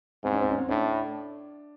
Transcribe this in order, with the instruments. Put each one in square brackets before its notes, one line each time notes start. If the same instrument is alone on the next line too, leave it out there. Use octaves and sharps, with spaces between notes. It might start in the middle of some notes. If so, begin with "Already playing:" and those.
[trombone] G#2 [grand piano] C4
[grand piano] C#4
C4
C#4
C4
[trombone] A2 [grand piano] D4